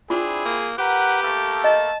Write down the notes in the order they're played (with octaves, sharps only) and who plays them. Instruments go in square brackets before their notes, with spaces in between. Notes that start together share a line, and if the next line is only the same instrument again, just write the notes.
[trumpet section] C4 E4 [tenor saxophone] D4 [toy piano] F4 [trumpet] G#4
[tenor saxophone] A#3
[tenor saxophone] G4 [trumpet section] A#4 F#5 [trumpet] B4
[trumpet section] A3 A#3 A4
[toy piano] D#5 [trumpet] A5